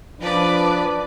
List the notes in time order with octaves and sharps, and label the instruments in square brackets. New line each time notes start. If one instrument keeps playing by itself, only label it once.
[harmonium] F3 [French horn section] D4 [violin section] B4 D5